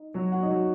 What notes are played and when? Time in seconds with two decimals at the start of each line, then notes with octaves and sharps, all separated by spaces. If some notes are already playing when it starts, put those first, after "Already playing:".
Already playing: D#4
0.14 F#3 F#4
0.32 F#4 F#5
0.43 D#4
0.50 F#3 F#4